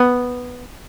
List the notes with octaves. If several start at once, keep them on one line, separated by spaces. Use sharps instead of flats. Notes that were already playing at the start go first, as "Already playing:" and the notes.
Already playing: B3